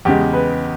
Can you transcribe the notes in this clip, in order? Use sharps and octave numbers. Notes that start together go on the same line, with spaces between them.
E2 C#3 G#3 G4
B4